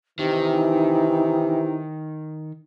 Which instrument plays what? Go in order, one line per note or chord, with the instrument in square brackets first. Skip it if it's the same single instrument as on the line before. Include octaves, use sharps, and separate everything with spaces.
[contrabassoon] C3 [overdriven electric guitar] D#3 [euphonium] E3 [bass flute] D#4